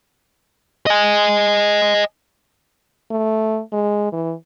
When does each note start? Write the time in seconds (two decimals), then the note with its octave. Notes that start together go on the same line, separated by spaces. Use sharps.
0.86 D#5 G#5
3.11 A3
3.73 G#3
4.12 E3